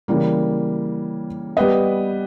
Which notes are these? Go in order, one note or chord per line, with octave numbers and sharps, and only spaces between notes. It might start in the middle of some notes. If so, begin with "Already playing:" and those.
C#3 E3 G3 A#3
G3 B3 G4 B4 D#5